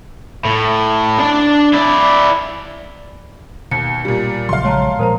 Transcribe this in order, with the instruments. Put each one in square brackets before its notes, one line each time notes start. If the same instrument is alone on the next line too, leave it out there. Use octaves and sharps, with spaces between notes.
[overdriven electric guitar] A2
D4 A5
E4 D5
[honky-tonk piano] D#2 [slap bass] B2 [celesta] C#7
[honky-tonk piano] A#2 G3
[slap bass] A#1 C#3 F#3 [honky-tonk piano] F5 C6
[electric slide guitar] G#3 E5 [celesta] C#5 A5 A#5
[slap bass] A#2 F3 F#3 [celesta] A#4 C5 A#5